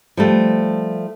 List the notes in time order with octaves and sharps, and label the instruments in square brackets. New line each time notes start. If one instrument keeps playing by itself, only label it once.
[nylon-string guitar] F3 G3 A3